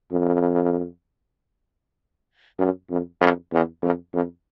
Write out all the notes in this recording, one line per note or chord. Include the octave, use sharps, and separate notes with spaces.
F2
F#2
F2
F2
E2
F2
F2